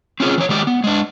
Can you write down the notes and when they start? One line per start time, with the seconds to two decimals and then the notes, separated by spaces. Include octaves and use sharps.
0.20 C4 C#4 F4 G#4 C#5
0.38 E3 C#5
0.49 D#3 G#3 G4 D5
0.67 B3
0.84 G#3 D4